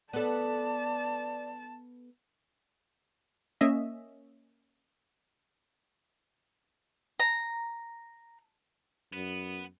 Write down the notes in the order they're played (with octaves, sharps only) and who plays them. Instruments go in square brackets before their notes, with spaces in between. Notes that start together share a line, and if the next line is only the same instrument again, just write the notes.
[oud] B3 A4 [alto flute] D5 [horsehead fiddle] A5
[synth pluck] A#3 C#4 D#5 E5
[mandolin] A#5
[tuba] F#2 [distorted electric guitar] B3